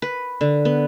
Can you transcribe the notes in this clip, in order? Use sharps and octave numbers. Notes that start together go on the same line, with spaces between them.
B4
D3
B3